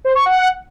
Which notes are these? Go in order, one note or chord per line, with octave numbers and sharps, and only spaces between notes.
C5
C#6
F#5